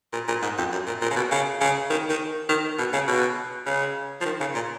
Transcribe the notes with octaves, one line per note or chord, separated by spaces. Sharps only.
A#2
A#2
G#2
F2
F#2
A#2
A#2
C#3
B2
C#3
C#3
D#3
D#3
D#3
B2
C#3
B2
C#3
F3
D#3
C#3
A#2